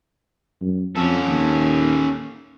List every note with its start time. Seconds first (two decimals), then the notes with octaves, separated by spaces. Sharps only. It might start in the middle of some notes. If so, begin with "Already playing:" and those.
0.61 F#2
0.96 F2 C#4 A4
1.28 D#2